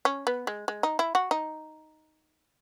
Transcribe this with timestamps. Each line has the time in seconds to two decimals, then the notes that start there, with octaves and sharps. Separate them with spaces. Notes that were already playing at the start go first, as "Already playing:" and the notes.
0.05 C#4
0.27 B3
0.47 G#3
0.68 G#3
0.83 D#4
0.99 E4
1.15 F#4
1.31 D#4